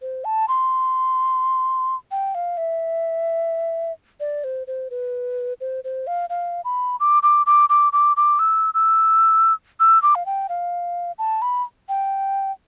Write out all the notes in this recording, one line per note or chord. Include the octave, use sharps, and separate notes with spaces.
C5
A5
C6
G5
F5
E5
D5
C5
C5
B4
C5
C5
F5
F5
B5
D6
D6
D6
D6
D6
D6
E6
E6
E6
D6
F5
G5
F5
A5
B5
G5